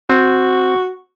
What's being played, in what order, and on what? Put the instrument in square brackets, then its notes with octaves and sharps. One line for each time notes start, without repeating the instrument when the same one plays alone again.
[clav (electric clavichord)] C4 [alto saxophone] F#4